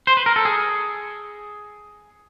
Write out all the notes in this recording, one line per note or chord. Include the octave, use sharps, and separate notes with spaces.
C5
B4
A#4
A4
G#4